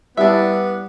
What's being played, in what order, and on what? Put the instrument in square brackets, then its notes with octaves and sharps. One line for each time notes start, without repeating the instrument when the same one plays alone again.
[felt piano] G3 [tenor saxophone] B3 [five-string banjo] D4 E5 [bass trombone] E4